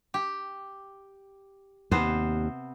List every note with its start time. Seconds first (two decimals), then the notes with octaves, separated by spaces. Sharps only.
0.14 G4
1.91 D#2 C3 B3 C5